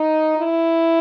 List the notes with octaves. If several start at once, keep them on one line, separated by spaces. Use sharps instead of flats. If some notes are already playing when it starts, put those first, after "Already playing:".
Already playing: D#4
E4